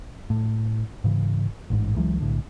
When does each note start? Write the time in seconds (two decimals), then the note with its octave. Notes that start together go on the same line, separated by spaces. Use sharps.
0.30 A2
1.04 G#2 C#3 E3
1.70 A1 G#2
1.96 C#2 E3 F#3 G#3
2.20 B1 A2 D3